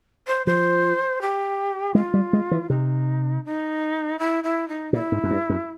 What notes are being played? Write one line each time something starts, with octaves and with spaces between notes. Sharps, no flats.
C5
F3 C5
G4
G#3 F4
G3
G#3
E3
C3 D#4
D#4
E4
E4
D#4
A#2 E4
G#2
F#2
G2
F#2